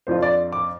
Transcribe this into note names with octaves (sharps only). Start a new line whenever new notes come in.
F2 F3 D4 F4 C5
D5
D6